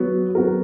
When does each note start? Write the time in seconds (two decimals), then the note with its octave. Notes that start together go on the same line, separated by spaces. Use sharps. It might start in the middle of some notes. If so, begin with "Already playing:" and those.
Already playing: F#3 B3 F#4
0.35 F#3 B3 F#4 A#4